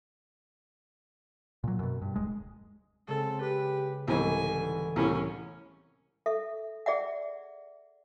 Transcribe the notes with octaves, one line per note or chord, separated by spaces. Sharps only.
A#2 F#3
F#2 B2
G2
D1 G#3
C#3 G#3 C4 A4
G4 B4
C2 G#2 D3 E3 G#3 G#5
C2 A2 C#4
A4 E5
G#4 D5 E5 F#5